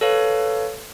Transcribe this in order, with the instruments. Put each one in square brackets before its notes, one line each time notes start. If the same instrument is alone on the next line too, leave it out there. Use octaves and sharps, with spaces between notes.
[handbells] A4 B4 C#5 F5